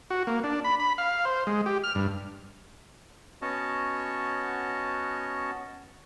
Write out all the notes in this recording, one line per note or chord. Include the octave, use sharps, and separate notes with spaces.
F#4
A#3
D4
B5
B5
F5
C5
G#3
G4
F6
G2
B3 C#4 F#4 C#5 D#5 A5